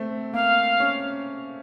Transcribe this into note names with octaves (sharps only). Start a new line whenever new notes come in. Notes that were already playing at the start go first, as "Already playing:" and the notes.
Already playing: A3 C4
A#3 F5
C#4